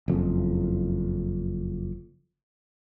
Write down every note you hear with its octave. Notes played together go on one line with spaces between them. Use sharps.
F#1 F2